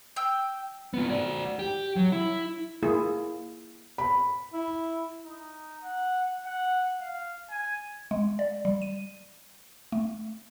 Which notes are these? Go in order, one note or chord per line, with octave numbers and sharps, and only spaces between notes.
G5 E6
B3 F4
F#4 D5
G4
F#3
E4
A#3 E4 F4 G#4
B5
E4
D#4
F#5
F#5
F5
G#5
G#3
D5
G3
D#7
A3